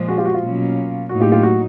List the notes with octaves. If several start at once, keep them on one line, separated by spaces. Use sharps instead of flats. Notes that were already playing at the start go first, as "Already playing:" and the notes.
Already playing: A#2 F3 G#3
F#4 G#4
F4 G4
F#4
F4
B2 F#3 A#3 C#4
A2 F#3 A#3 D#4 F#4
F4 G4
F4 G4
F#4